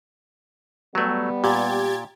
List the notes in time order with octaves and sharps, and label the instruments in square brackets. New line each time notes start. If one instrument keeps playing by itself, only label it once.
[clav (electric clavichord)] F#3 A3 [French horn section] G3 B3
[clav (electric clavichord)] A#2 [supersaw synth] G4 G#6 A6